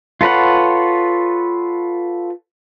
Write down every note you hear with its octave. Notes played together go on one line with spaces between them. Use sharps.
F4 A4 B4 C#5 F#5